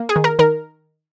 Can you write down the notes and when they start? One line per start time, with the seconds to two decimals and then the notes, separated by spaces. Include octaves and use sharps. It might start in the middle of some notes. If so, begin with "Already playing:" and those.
Already playing: A#3
0.09 G#4
0.16 D#3
0.24 A#4
0.39 D#3 A#4